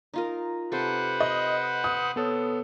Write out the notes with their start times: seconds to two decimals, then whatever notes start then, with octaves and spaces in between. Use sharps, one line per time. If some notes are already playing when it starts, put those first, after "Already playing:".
0.14 D#4 F4 A#4
0.72 C3 A4 B4 C5 F#5
1.20 D#5
1.84 D#6
2.16 B3 A4 C#5